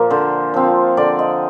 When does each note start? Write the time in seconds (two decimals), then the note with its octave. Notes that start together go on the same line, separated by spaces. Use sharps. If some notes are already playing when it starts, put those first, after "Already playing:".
Already playing: A#2 F3 A#3
0.10 D3 C5
0.54 F3 C4
0.97 D3 D5
1.19 D#5